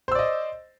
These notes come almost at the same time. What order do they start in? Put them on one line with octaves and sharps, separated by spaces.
C5 E6 D5 D#5